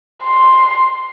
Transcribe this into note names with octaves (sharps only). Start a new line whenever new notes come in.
C6